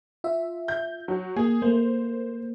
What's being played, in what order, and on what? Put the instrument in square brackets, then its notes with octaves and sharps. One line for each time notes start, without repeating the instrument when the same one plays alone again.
[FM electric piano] F4 E5
[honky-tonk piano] G6
F#3
[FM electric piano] A#3 [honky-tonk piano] G#4
[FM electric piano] A3 A#3 [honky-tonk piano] C5